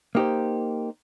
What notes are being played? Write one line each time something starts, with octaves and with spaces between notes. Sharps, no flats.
A#3 D#4 G4 C5